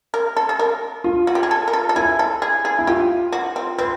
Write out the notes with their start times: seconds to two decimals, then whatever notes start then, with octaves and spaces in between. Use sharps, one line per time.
0.14 A#4
0.36 A4
0.49 A4
0.59 A#4
1.04 F4
1.27 F#4
1.35 G4
1.43 G#4
1.51 A4
1.68 A#4
1.73 A4
1.89 A4
1.96 E4 G#4
2.19 A4
2.42 G#4
2.65 G#4
2.79 E4
2.87 F4 G4
3.32 F#4
3.56 C4
3.78 C4 B4